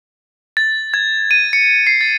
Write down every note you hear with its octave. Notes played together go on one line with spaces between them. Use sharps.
A6
G#6
D#7
C#7
C7
A6